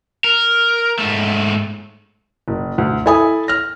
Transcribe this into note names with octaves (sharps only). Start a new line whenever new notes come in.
A#4
G#2 A3
F#1
D2
E4 A4 G#5 B5 D#6
F6 A#6